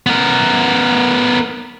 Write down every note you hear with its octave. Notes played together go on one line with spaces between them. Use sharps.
B3 A#4